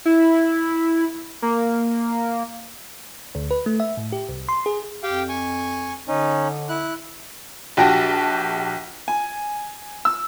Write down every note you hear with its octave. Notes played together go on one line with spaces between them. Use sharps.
E4
A#3
D2
B4
A3
E5
A2
G4
C2
C6
G#4
F2 G4 F5 G5
G#5 C#6
D3 C#4 D#4
E4 F#6
A#1 F#4 G4 G5 A5 A#6
G#5
E6